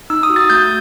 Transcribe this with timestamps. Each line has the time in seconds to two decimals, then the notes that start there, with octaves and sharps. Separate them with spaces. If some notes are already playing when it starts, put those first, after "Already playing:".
0.10 D#4 E6
0.23 D#6
0.29 F#4
0.36 A6
0.50 A3 G6